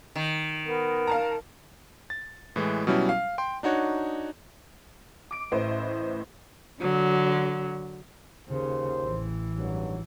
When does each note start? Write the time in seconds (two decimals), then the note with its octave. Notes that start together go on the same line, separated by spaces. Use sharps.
0.15 D#3
0.67 B3 A#4
1.07 F5 A5 A#5
2.10 A6
2.56 A2 E3 G#3
2.87 B2 F#3 G3 C#4 E4
3.09 F5
3.38 G5 C6
3.63 D4 D#4 F#4 C#5
5.31 D6 D7
5.52 A1 A2 E4 B4 C5 D#5
6.79 D3 F#3
8.49 D#2 C#3 C5
9.03 A1 E3
9.58 G#1 G2 F#3